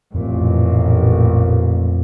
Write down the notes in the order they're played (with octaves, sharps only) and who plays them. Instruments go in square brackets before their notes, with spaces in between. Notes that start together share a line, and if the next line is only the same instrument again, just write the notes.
[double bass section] A1 A#2 [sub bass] F2